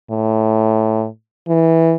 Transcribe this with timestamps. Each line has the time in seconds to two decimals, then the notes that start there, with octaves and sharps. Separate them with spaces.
0.11 A2
1.48 E3